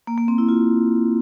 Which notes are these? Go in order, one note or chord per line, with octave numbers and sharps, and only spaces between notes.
A#3
A#3
C4
E4
F4